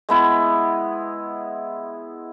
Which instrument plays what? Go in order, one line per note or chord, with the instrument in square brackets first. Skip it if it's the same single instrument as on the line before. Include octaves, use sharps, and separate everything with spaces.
[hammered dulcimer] G#3 B3 E4